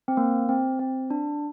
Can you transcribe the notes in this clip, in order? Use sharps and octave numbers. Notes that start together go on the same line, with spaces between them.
C4
A#3
C4
C4
D4